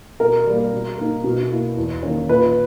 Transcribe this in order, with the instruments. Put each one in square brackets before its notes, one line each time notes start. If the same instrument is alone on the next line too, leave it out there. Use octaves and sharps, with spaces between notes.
[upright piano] B2 A#4
G3 A#3
B2
A#3 D#4
B2
A#3 E4
E2
D#3 A#3 C#4
A#2 B4